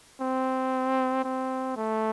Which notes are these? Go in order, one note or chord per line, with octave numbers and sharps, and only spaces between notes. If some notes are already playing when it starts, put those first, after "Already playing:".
C4
C4
A3